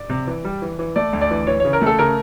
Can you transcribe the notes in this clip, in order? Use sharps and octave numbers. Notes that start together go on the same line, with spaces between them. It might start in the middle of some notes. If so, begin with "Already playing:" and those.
Already playing: D5
C3
E3
G3
E3
E3
A3 D5
D2
D5
E3
E3 C#5
C#3 C#5
A#4
A3 A4
C#3 A#4